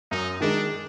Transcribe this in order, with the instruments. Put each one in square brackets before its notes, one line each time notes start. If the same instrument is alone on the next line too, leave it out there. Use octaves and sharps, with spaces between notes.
[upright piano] F#2 [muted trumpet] D#4
[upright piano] D#3 G#3 D#4 [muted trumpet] D4